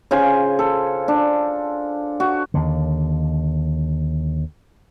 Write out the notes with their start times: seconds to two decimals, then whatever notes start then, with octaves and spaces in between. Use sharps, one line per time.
0.11 C#3 F4 C5 G#5
0.59 A4
1.08 D4
2.20 F#4
2.54 D#2 D3